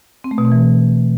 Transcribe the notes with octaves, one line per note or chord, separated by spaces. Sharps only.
C4
A3
B2
C4
E3